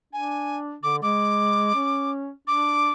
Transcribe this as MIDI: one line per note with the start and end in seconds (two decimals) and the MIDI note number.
0.13 0.75 62
0.13 0.58 80
0.83 0.99 50
0.83 0.96 86
1.03 1.71 56
1.03 2.11 86
1.75 2.30 61
2.47 2.92 62
2.47 2.93 86